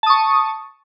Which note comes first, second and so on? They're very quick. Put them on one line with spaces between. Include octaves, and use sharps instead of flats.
A5 D#6 C#6